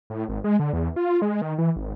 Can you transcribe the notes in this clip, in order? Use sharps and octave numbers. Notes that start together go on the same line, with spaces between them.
A2
G#1
G#3
D3
E2
F4
G#3
D#3
E3
G#1